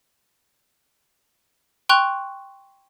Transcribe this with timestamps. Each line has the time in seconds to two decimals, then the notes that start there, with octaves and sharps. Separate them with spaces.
1.89 G5 C6 C#6 F#6 F7